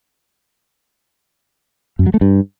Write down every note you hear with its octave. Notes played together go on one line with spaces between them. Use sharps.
F#2
F#3
A3
G2